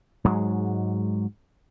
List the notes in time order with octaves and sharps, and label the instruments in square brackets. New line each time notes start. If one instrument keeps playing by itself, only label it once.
[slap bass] G#2 F#3 G#3